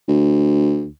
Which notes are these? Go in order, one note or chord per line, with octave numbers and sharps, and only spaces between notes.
D2